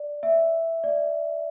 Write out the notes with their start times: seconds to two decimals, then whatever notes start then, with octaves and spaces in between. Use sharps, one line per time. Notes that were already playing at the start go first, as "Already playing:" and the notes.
Already playing: D5
0.23 E5
0.84 D5